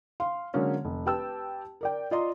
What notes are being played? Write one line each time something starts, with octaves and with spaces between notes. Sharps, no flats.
F5 C6
D3 F#3 G#3 A#3 C#4
F1
G4 B4 G5 A5 E6
A#4 D5 G5
F4 D5 D#5 A#5 C6